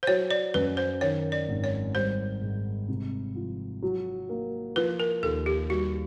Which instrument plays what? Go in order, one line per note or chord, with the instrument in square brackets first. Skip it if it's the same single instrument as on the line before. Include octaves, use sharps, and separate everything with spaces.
[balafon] C5
[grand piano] F#3 [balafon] C#5
[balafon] D5
[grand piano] F#2 [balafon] B4
[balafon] C5
[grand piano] D#3 [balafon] C#5
[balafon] D5
[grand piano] G#1
[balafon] C#5
[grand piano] G3 [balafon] C5
[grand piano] G#2
C3
F3
F#3
A#3
[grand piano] F3 [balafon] B4
[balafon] A#4
[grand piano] D#2 [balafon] A4
[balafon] G4
[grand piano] G3 [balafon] F#4